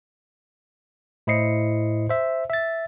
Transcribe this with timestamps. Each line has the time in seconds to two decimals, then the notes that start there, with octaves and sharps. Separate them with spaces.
1.27 A2 E4 C5 D#5 C7 C#7
2.09 C5 E5
2.50 E5 A6